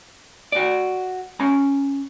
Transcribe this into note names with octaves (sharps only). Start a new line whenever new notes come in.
F#4 D5
C#4 A#5